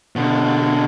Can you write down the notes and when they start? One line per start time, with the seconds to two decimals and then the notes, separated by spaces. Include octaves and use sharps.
0.16 B2 D3